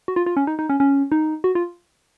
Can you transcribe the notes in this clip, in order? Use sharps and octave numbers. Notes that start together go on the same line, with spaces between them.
F#4
F4
F4
C#4
D#4
D#4
C#4
C#4
D#4
F#4
F4